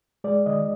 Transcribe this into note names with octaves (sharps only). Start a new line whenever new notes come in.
G#3 D5
D#3 D#5